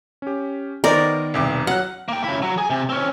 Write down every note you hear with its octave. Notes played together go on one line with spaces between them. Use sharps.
C#4 G4
D#3 B3 A#4 C5 D5 D#5
E1 C2 D6
F#3 F#5 F6 F#6
A#3 G5
C#3 E4
F#3
G#4 G#5
C3
C4 C#4